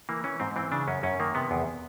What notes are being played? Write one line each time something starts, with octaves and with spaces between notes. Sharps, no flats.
E3 A#3
E3 C#4
G#2 C4
E3 C4
C#3 D4
F#2 C#4
F#2 C#4
D#3 A#3
C3 B3
E2